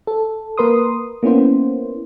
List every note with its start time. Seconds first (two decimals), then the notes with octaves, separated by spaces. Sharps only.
0.07 A4
0.58 A#3 A#4 B4 C6 D#6
1.23 A#3 B3 C#4 E4 C5